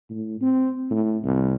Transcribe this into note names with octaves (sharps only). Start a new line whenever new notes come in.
A2
C4
A2
C2